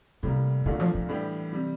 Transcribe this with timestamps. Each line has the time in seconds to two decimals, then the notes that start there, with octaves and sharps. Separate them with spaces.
0.23 A2 C3 G3 A#3
0.66 C2 A#2 D3 A3 D4 F4
0.80 F3
0.95 F3
1.09 A2 E3 G3 D4 G4
1.53 C3 G3